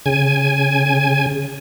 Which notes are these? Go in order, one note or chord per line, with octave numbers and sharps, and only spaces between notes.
C#3 G#5